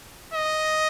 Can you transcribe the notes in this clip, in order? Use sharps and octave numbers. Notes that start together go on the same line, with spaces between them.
D#5